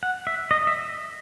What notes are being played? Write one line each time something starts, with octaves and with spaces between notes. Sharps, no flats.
F#5
E5
D#5
E5